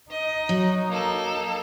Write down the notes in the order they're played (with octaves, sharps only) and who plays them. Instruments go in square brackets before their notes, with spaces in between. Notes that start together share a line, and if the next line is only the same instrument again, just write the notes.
[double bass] D#4 [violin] D#5
[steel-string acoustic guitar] F#3
[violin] A#3 A4